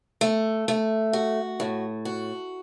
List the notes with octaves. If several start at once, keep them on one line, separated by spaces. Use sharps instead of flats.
A3
A3
F#4
A2
F#4